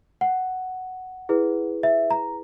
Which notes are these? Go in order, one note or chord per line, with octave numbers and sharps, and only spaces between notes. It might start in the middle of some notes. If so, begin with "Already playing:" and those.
F#5
E4 G#4 B4
E5
A#5